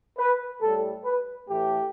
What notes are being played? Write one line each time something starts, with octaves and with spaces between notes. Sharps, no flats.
B4
A2 G3 A4
B4
A2 E3 A3 G4